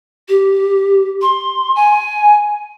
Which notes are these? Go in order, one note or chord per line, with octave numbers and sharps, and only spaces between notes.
G4
C6
G#5